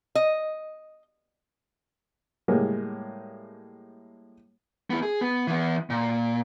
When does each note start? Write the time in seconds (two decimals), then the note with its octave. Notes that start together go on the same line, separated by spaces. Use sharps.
0.15 D#5
2.48 A2 G3 G#3 A#3
4.90 B3 E4
5.02 G#4
5.21 B3
5.47 E3 B3
5.90 A#2